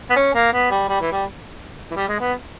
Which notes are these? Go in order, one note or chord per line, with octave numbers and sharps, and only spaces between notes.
B3
C#4
A#3
B3
G3
G3
E3
G3
E3
G3
G#3
B3